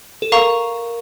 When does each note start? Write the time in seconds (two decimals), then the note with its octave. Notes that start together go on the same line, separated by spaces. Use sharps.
0.22 A4
0.32 A#4 F5 A#5 C#6